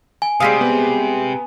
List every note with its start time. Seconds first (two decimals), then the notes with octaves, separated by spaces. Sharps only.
0.22 G#5
0.40 C3 G3 G#3 F5 D#6 E6 B6
0.61 B3